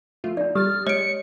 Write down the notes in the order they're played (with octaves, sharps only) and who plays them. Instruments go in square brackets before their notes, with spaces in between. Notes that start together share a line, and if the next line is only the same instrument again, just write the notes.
[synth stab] F3 A3 F4
[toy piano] D4 D5 [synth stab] D#4
[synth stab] G3 A6 [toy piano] G4 D#6 [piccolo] F6
[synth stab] G#3 [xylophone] C#5 D7 [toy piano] D#5 [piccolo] C#7